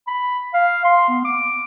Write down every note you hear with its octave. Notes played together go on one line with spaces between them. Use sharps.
B5
F5
C6
B3
D6